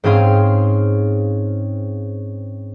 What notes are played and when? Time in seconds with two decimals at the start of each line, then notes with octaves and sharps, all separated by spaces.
0.04 G#2 C4 C#4 G#4 F5 C6